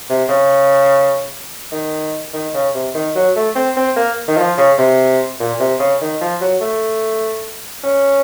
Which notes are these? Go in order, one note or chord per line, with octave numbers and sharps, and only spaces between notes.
C3
C#3
D#3
D#3
C#3
C3
D#3
F#3
A3
C4
C4
A#3
D#3
F3
C#3
C3
A#2
C3
C#3
D#3
F3
F#3
A3
C#4